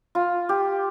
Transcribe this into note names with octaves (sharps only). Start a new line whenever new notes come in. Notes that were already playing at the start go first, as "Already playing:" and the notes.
F4
G4